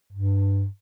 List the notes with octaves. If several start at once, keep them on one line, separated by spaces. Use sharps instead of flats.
G2